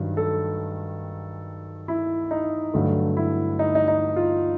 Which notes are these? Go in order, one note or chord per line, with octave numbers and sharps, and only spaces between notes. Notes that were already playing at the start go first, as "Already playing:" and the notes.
Already playing: G2 D#3 F#3
A4
E4
D#4
G2 D3 F#3 A3
E4
D#4
D#4
D#4
F4